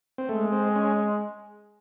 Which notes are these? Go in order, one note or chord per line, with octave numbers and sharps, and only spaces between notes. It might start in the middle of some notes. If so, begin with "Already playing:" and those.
C4
G#3 A3
C4
C#4